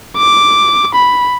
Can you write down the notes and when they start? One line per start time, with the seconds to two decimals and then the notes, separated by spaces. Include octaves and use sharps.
0.17 D6
0.95 B5